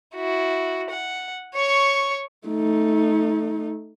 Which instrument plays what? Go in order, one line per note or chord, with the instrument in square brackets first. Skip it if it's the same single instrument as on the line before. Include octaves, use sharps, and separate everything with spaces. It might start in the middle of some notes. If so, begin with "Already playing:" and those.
[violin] E4 F#4
F#5
C#5 C#6
[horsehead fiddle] A3 D#4